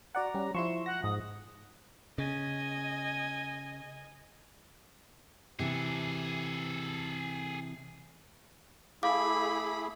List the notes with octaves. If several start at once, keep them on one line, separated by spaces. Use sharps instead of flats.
F#4 D5 F#5 A#5
G3 C#4
F3 E4 C6 C#6 E7
F#5 A#6
G#2 D#6
C#3 D#5 G#5
C3 E3 G#4 A4
A3 E4 G#4 F5 B5 D6